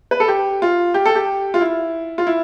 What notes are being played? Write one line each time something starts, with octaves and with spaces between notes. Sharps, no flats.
B4
A4
G4
F4
G4
A4
G4
F4
E4
F4
E4